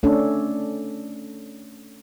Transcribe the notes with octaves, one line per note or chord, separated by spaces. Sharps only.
A3 C#4 D4 A4